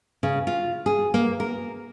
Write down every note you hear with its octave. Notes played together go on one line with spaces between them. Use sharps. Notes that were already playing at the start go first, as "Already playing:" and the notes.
C#3
F4
G#4
A#3
A#4